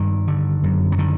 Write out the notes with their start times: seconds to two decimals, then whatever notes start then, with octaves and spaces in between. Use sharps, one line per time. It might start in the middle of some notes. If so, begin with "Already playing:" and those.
Already playing: G2 D#3
0.27 D3
0.64 F#2
0.92 F#3
0.98 D3 D#3